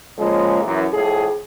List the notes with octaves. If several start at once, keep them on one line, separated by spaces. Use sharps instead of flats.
A#2 C#3 F3 G#3
F#2 E3
F2 A2 G#4